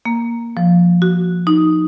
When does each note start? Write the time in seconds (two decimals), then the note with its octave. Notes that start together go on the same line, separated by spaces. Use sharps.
0.05 A#3
0.57 F3
1.02 F#4
1.47 D#4